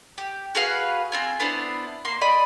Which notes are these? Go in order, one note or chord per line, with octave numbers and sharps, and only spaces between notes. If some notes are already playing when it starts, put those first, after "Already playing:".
G4
F#4 G#4 B4 F5
C4 F4 G#5
B3 D4 E4 C5
A#3 C6
D5 D#5 B5